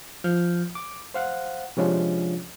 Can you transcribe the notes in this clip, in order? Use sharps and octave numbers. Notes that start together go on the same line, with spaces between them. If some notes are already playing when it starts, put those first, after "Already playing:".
F3 F6 G6
D6
C5 F5 F#5
C3 F3 G#3 C#4 D4 F4